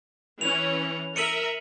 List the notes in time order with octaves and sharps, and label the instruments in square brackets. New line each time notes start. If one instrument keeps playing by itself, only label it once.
[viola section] E3 C#4 [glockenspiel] F7
[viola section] A#4 E5 [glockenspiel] C#7 D#7 F#7